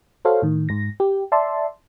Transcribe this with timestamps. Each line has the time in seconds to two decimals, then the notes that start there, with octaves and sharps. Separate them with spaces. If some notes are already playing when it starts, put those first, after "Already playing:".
0.25 F#4 A4 C5 C#5 F5
0.42 A2 D#3
0.69 G#2 A#6
1.00 G4
1.32 D5 E5 A5 C6